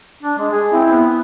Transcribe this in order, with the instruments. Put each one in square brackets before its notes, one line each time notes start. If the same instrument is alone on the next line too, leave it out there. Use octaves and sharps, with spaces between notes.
[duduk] D4
G#3
G#4
[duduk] C4 [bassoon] E4
[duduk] B3